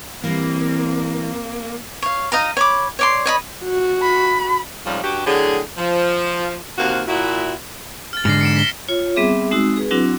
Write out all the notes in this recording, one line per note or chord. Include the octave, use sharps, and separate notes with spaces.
E3 G3 A#3 C4
C#5 F5
D#4 D#5 F5 A#5
C#5 B5 D6
C#5 D5 C6
C#5 D#5 B5
F#4
B5
F2 G#2 C3 F3 G3 C#4
G2 F#4 G4
A2 D3 F#3 G#4
F3
D#2 C3 F3 A#3 F#4 F5
A#2 E4 F#4
F6 A6
G#2 D3 F6 A#6 C7
C#7 D7 E7
B6 G7
F4 C#5
G3 B3 C4 G#4 E5 D6
G#3 C4 D#4 F#4 E6
G#4 B4
F#3 C4 D4 E4 F#4